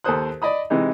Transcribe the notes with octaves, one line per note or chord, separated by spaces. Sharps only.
D#2 A4 A#4 C5 D#6 F#6
D5 D#5 B5 D#6
C3 E3 G#3 D#4